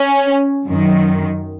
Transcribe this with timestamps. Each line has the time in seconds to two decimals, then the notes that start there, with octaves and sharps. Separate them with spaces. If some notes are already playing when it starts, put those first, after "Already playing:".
Already playing: C#4
0.68 F#2 D#3